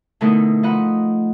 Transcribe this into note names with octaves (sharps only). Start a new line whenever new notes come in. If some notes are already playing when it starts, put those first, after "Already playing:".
B2 D3 A3 D#4 E4 A#4
F3 D#4 D#5 F#5 B5